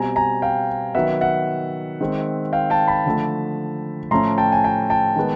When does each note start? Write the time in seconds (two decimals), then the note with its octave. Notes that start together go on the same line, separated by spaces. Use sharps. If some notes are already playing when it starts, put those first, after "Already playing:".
Already playing: B2 G3 C4 G#5 A#5
0.16 G#5 A#5
0.42 F5 G5
0.94 D#3 F#3 B3 E5 F#5
1.21 E5 F#5
2.01 D#3 G#3 C4
2.53 F5 G5
2.70 G5 A5
2.88 A5 B5
3.06 D3 F3 A3
4.11 A2 F3 A3 C#4 A#5 C6
4.38 G5 A5
4.52 G#5
4.64 G5 A5
4.90 G5 A5
5.16 D#3 G#3 B3